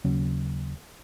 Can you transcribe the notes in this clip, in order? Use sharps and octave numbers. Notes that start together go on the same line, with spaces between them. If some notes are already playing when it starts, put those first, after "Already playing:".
D#2 C#3 F#3 C#4